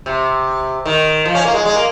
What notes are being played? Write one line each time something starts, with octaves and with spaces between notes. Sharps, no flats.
C3
D#3
F3
C#4
A#3
G#3
G#3
A#3